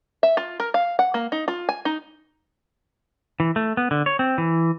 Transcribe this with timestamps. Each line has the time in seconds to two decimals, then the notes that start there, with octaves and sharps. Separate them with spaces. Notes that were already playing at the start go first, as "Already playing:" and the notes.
0.23 E5
0.37 F4
0.60 A#4
0.74 F5
0.99 F#5
1.14 A#3
1.32 D#4
1.48 F4
1.69 G#5
1.85 D#4
3.40 E3
3.56 A3
3.77 B3
3.91 D3
4.06 C#5
4.19 C4
4.38 E3